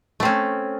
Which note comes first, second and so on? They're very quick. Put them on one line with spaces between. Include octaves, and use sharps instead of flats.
A3 C4 C#4